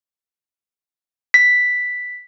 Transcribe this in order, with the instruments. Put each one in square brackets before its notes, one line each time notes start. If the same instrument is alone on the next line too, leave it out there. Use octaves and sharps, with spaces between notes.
[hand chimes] B6